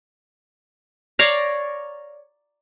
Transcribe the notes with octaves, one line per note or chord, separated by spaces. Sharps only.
C#5 D5 F5 A#5